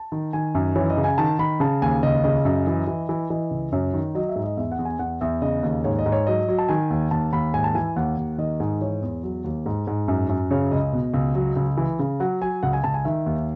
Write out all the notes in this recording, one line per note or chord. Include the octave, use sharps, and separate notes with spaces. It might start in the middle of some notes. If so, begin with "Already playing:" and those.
Already playing: A5
D#3
D#3 G#5
F#2
E3 C#5
D#5
C#3
G#5
D#3 A5
D#3 B5
C#3 A5
D#2 G#5
C#2 D#5
C#3 D#5
F#2
E3
E3
E3
E3 D#5
C#2
F#2 C#5
D#3
F#3 D#5
E5
G#2
D#5
E2 E5
F#5
E2
G#5
E2 F#5
E2 E5
C#3 D#5
D#2
G#2 C#5
D#5
G#2
C#5
F#3 D#5
F#3
A5
D#3 G#5
D#2
D#2 A5
D#2 B5
G#2 G#5
A5
E3 G#5
D#2 F#5
D#2
D#3 D#5
G#2
E3 C#5
E2
F#3
D#2
G#2
G#2
F#2
F#2
C#3 C#5
C#2 D#5
B2
C#2
F#3
C#2
E3
C#3
F#3 F#5
F#3 G#5
C#2 F#5
G#5
C#2 A5
G#5
D#3 E5
D#2